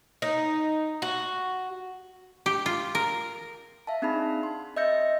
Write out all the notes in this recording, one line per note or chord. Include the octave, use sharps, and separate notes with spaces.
D#4
F#4
G4
F4
A#4
E5 F5 A5
C4 D4 D#4 G#4 A5 B5
C6
D#5 E5 E6 G6 A#6 C#7